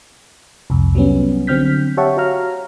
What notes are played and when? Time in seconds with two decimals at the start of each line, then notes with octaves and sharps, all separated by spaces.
0.70 C2 F2
0.95 F#3 G3 B3 C#4
1.47 D3 F#3 C4 F6 G6 B6
1.97 G4 C#5 E5 F#5 A5 C#6
2.17 F#4 C#5 F5 A#5 F6